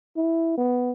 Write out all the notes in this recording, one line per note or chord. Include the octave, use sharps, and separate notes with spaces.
E4
B3